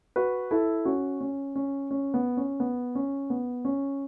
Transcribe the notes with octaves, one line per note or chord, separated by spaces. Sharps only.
F#4 B4
E4 A4
C#4 F#4
C#4
C#4
C#4
B3
C#4
B3
C#4
B3
C#4